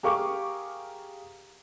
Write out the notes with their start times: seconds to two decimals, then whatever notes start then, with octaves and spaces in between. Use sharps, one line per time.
0.03 G4 G#4 A#4 F5 C#6 D6